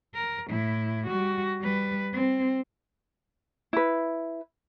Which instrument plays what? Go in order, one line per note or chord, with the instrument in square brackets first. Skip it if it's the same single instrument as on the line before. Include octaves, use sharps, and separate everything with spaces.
[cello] A#4
A2 E4
G3 F#4
G3 B4
C4
[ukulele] E4 B4